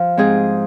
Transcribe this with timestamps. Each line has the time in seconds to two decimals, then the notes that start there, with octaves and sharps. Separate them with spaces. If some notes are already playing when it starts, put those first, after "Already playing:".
Already playing: F3
0.17 G#2 G#3 C4 G#4